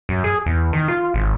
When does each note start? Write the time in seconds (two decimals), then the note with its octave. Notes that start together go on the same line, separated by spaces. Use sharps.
0.09 F#2
0.24 G#4
0.46 E2
0.73 D#3
0.88 F4
1.14 G#1